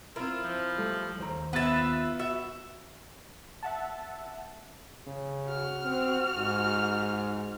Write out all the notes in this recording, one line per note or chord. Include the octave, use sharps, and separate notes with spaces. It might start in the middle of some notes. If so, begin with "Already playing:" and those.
C4 E4 F4 A#4
F3
G3 A3 A4
D#2 C5 A#5
B3 F4 B4 E5 A6
F#4 E5
E5 F#5 A5
C#3
F#4 F6
C4
G#2